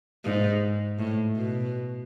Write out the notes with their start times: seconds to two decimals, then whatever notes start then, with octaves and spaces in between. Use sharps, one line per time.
0.25 G#2
0.99 A2
1.36 B2